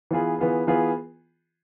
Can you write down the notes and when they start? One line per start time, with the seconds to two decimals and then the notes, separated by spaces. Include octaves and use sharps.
0.11 E3 B3 F4 G#4
0.39 E3 B3 F4 G#4
0.67 E3 B3 F4 G#4